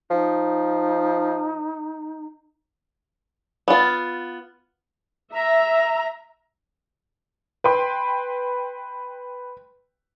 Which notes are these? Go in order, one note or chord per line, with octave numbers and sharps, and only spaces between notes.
F3 D#4
B3 F4
E5 A#5
B4 G5 C6